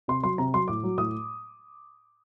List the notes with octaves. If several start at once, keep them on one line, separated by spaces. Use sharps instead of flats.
C3 C6
F#3 C6
C3 A#5
F#3 C6
A2 D6
F#3
A2 D#6